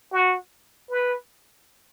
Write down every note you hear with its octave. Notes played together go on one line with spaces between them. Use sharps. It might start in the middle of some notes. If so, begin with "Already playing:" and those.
F#4
B4